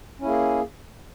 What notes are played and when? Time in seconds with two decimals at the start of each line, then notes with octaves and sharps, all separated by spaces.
0.20 C#4
0.23 E4
0.25 A#3
0.28 G#4